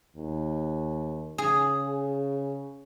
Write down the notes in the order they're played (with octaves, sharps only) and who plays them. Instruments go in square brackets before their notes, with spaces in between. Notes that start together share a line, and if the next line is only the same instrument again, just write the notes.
[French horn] D#2
[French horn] C#3 [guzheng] G#4